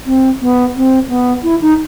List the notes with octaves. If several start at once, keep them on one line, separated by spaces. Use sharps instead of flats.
C4
B3
C4
B3
E4
D#4